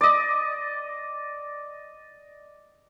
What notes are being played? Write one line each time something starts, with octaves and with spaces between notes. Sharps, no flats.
D5 D#5